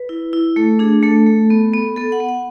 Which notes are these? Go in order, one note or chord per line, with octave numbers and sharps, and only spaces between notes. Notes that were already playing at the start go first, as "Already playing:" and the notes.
Already playing: B4
E4
E4
A3 A4
D4 G#4
A3 A4
A3
B3
B3
B3 A4
F#5
B3
F#5